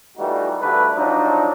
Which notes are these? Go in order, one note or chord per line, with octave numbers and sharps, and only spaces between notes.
A#2 E3 G3 A3 D#4 F#4
D2 G2 D3 G3 A3 B4
F3 F#3 D4 D#4